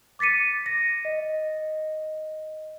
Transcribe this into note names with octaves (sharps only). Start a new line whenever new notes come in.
D6 A6 B6 C#7 D#7
A#6
D#5